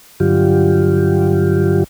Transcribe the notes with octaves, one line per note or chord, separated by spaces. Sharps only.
G2 D3 F#3 F4 G4